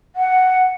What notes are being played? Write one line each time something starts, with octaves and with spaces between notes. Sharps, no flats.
F#5